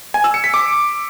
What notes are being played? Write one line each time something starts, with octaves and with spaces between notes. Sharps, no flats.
G#5
E6
C#7
B6
D6